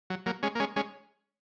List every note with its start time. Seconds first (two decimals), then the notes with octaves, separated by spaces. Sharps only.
0.10 F#3
0.26 F#3 A#3
0.43 G#3 C#4
0.55 A#3
0.60 G#3 C#4
0.76 G#3 C#4